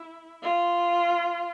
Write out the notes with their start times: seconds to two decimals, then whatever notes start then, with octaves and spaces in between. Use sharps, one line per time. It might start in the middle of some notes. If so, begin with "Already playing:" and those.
Already playing: E4
0.43 F4